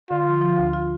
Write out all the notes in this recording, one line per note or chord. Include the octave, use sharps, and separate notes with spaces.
D3 F4
F3
F3
D2
F4